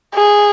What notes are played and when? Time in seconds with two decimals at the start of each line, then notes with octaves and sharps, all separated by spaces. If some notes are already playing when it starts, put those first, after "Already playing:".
0.15 G#4